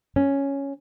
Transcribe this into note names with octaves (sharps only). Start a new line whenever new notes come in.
C#4